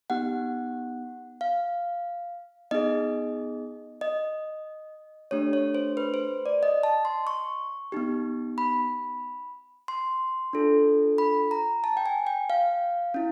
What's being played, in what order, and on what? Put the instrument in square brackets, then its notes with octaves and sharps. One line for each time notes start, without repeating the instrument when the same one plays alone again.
[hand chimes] B3 D#4 G4 F#5
F5
B3 D#4 G#4 D#5
D#5
A3 D4 G4 C#5
C#5
C5
B4
C5
D5
D#5
A5
C6
C#6
B3 D#4 G4
B5
C6
D4 F4 A4
B5
A#5
A5
G5
G#5
G5
F5
C#4 E4